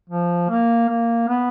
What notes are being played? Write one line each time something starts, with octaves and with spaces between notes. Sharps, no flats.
F3
A#3
A#3
B3